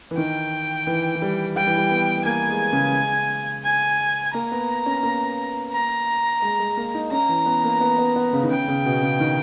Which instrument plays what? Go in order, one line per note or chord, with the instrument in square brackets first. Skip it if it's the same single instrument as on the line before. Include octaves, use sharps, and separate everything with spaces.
[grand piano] E3
[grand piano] D#3 [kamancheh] G5
[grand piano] E3
E3
G3
[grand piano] G3 [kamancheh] G5
[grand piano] E3
G3
B3
B3
[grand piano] A#3 [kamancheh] G#5
[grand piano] G#3
C#3
G#3
[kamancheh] G#5
[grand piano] A#3 [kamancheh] A#5
[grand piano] B3
C#4
A#3
[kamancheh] A#5
[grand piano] G#3
G#3
A#3
D#4
[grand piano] C#4 [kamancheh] A#5
[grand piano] E3
B3
A#3
B3
B3
B3
C#3
D#3
[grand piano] C#3 [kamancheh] G5
[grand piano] C#3
B2
C#3
D#3